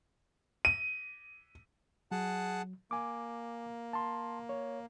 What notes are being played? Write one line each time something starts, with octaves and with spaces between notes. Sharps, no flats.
D#7
F#3 G#4 F#5 A5
A#3 G#5 D6
A5 C6
C#5